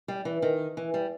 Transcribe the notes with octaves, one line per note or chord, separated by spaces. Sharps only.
G3
E3
D#3
E3
G3